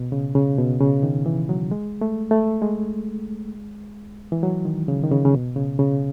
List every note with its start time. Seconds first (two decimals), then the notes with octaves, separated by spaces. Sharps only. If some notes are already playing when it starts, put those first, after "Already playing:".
Already playing: B2
0.12 C#3
0.35 C#3
0.58 B2
0.81 C#3
1.03 D#3
1.26 E3
1.49 F#3
1.71 G#3
2.01 A3
2.31 A3
2.62 G#3
4.32 E3
4.43 F#3
4.65 D#3
4.88 C#3
5.04 D#3
5.11 C#3
5.25 C#3
5.34 B2
5.56 C#3
5.79 C#3